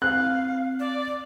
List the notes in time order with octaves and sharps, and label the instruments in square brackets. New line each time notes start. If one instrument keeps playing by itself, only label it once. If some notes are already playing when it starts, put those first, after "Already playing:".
[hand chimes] C4 [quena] F5 [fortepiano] F#6
[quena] D5